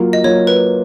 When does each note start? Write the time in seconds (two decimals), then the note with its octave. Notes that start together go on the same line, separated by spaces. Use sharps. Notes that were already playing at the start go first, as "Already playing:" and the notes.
Already playing: F#3 A#3 F4
0.13 D#5
0.24 F#3 A#3 F4 C#5
0.47 B4